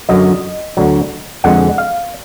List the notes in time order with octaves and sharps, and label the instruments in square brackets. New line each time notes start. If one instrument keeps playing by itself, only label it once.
[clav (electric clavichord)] F#2 D3 F#3 D#5
D2 D3 F#3
F2 D3 G#3 F#5
F5